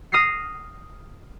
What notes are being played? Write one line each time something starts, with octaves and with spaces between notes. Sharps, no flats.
D#6 F6 A#6 C7 C#7